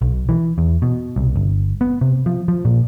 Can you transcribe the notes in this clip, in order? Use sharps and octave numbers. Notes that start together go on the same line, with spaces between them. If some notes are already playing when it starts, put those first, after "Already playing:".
B1
E3
E2
B2
C2
G1
B3
C3
F3
F3
A#2